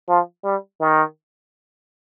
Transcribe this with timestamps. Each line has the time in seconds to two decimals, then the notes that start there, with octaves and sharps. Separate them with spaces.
0.08 F3
0.44 G3
0.80 D#3